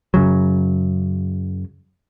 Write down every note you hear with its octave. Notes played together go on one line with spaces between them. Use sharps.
F#2 C#3 F#3